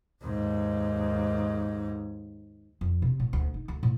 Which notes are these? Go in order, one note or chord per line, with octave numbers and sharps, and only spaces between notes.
D#2 G#2
F2
C3
A2
D2
D#4
D2
A2